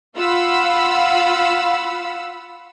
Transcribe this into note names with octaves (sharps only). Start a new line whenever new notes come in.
F4 F5 F#5 B5 E6